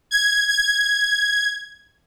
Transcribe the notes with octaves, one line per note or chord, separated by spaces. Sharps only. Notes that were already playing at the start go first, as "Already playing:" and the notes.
G#6
G#6